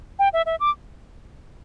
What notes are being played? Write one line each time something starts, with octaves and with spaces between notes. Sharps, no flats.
G5
E5
E5
D6